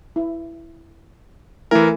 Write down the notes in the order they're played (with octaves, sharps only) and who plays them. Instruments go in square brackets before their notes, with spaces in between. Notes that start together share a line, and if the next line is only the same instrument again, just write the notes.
[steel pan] E4
[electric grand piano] E3 A#4 [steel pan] A3 E4 G#5